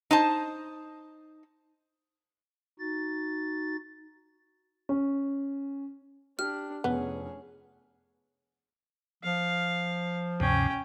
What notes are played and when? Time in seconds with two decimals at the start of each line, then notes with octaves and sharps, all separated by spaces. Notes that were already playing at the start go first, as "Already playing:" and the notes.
0.11 D#4 C5 A5
2.79 D#4 F#4 A6
4.89 C#4
6.39 D4 G4 F6
6.84 F1 B3 C#4 G#4
9.23 F3 F5
10.40 D2 G2 C3 C#4 G5